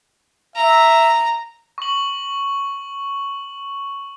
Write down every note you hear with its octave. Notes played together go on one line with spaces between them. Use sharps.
E5 A#5
C#6 F#7